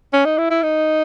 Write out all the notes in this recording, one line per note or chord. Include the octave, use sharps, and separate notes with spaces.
C#4
D#4
E4
E4
D#4